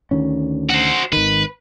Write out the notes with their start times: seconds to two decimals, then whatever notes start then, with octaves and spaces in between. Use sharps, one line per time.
0.11 D2 D#3 C#4
0.69 F#4 C5
1.13 G#1 D#3 B4